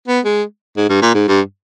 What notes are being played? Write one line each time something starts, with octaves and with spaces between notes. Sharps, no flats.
B3
G#3
G#2
G2
A#2
G#2
G2